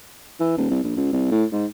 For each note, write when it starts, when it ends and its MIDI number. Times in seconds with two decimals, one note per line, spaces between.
0.40 0.57 52
0.58 0.69 27
0.70 0.81 36
0.84 0.93 34
0.97 1.09 37
1.13 1.30 36
1.31 1.45 45
1.52 1.66 44